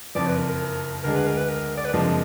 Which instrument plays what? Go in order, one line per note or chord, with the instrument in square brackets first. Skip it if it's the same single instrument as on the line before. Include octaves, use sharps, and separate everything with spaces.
[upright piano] F#1 F2 F3 [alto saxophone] D5
[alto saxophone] B4
A#4
A#4
[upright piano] D2 D3 G#3 D4 G#4 [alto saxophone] A#4
[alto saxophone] B4
A#4
B4
A#4
D5
B4
[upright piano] F#1 F2 F3 G#3 D4 [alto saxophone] A#4